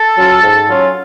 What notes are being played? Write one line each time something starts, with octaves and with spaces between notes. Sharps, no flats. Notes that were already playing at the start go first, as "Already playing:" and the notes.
Already playing: A4
F#3 C#4 F4
G#2
F#3 C#4 F4